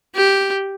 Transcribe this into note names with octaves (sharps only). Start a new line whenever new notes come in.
G4